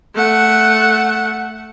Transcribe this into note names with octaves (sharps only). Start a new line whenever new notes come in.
A3 F#5